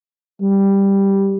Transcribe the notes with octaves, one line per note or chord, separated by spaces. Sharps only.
G3